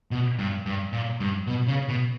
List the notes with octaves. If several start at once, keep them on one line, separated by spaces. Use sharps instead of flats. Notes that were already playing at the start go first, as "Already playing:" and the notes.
B2
G2
G2
A#2
G2
B2
C#3
B2